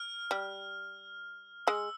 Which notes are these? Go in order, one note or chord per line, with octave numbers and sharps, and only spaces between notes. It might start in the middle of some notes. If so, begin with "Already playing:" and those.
Already playing: F6
G3
G#3 E6